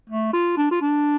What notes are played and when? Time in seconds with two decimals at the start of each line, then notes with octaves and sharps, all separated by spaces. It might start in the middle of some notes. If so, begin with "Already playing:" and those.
0.09 A3
0.33 F4
0.57 D4
0.71 F4
0.82 D4